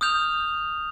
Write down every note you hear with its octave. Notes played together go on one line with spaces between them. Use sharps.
D#6 F6 G6 F7